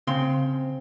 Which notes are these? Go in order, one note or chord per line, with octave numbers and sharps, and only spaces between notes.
C#3 C4 C6